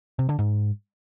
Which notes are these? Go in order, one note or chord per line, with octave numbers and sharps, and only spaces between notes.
C3
D3
G#2